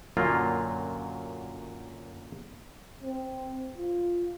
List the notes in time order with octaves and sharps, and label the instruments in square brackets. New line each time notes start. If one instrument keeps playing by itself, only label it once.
[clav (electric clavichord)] F#2 A#2 D3 F#3 A#3 F4
[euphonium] C4
F4